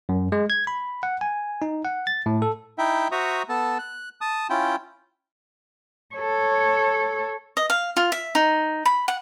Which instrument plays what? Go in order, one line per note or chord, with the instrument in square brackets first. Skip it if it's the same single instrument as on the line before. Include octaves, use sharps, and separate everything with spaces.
[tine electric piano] F#2
G#3
G#6
B5
F#5
G#5
D#4
F#5
A6
A2
A4
[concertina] D#4 E4 E5 G5
F#4 C5 E5 A#5 C#6 D#6
B3 A4 A5
F#6
A5 D#6
C#4 E4 F4 G5
[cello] A4 C#5
[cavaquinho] D#5
F5
F4
E5
D#4
B5
F#5